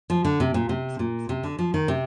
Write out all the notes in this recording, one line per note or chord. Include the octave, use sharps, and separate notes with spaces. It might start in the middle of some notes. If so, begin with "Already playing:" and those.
F3
D3
C3
A#2
C3
A#2
C3
D3
F3
D#3
C3